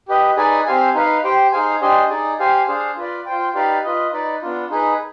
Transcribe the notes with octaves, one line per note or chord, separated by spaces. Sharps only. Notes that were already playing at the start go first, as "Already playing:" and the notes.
G4 B4 D#5
D#4 G#4 B4 D5 G#5
C4 G4 C5 F5 G#5
D#4 B4 F5
G4 C5 G5
D#4 G#4 C5 F5 G#5
D4 G4 C5 D#5 G#5
D#4 G#4 D5
G4 C5 F5 G#5
D4 G#4 C5 F5
F4 B4 D5
F4 C5 G5
D#4 G4 B4 D5 F5
F4 B4 D#5
D#4 B4 D5
B3 D4 F4
D#4 G#4 B4